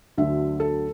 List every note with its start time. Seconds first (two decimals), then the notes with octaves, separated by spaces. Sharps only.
0.18 D2 D3 F#3 E5
0.60 A4